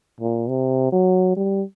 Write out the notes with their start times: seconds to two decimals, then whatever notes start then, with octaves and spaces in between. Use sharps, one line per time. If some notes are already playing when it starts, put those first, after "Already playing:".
0.20 A#2
0.49 C3
0.92 F#3
1.36 G3